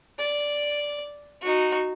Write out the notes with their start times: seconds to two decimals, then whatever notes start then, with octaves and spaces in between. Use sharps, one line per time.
0.19 D5
1.42 D#4 F#4